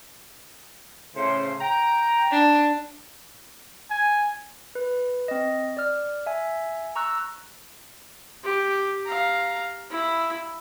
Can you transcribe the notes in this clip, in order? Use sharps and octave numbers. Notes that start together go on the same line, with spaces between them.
A2 C#3 C5
G5 A#5
D4
G#5
B4
C4 D#5
D5 F6
E5 G#5
A#5 C#6 E6 F#6
G4
F5 A#5
E4